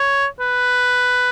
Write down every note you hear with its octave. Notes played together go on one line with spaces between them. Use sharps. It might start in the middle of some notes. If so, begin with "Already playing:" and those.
Already playing: C#5
B4